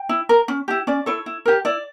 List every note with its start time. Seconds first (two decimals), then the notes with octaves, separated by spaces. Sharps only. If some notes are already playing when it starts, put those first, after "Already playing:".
Already playing: G5
0.09 E4
0.29 A#4
0.48 C#4
0.68 E4 G4
0.87 C#4 D5
1.06 E4 A4 C#5
1.26 E4
1.46 G4 A#4
1.65 E4 D5